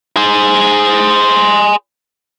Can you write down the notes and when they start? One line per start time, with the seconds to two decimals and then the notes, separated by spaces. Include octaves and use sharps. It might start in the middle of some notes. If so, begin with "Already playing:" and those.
0.16 G#4 C5